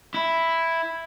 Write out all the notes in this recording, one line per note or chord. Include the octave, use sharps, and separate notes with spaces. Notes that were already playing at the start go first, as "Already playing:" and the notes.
E4